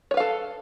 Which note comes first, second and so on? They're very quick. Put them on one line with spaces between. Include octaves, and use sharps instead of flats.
C#5 B4 F5 A4